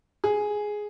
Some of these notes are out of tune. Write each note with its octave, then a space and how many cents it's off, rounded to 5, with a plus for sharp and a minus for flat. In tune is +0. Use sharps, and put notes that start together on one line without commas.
G#4 +5